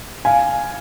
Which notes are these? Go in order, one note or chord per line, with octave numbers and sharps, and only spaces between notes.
F5 G#5